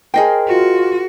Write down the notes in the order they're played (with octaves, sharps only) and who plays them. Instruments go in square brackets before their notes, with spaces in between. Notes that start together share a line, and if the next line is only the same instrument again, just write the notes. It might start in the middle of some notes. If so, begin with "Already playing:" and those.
[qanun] G#4 A#4 C5 [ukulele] D#5 G5
[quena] F4 [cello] F#4